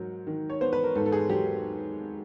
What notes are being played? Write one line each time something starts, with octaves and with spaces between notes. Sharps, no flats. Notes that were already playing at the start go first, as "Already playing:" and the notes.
Already playing: G#2 F#3 A#4
D#3
C#5
B3 C5
B4
A#4
G#2 A4
A4
G#4
F#3 G4